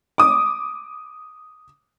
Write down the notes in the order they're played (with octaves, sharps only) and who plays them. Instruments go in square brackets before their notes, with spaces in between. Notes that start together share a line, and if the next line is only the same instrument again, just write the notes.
[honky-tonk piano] D6 D#6